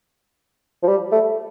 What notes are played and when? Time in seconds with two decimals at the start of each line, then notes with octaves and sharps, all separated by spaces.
0.83 F3
0.88 G3
1.12 A3